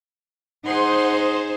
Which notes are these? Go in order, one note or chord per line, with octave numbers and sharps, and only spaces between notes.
D#4 G#4 C5 F#5 C6